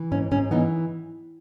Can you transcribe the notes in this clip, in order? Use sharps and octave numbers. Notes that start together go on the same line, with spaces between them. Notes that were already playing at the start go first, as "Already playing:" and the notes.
Already playing: E3
G#2 C#4
G#2 C#4
E3 B3 D#4